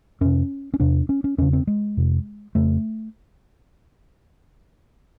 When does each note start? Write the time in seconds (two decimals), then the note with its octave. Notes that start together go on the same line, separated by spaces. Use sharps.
0.21 F2 C3 C#4
0.74 C#4
0.80 E2 C3 D4
1.09 C#4
1.24 C#4
1.38 E2 C#3 C#4
1.53 C4
1.67 G#3
1.97 F2 C3
2.55 F2 C#3 A3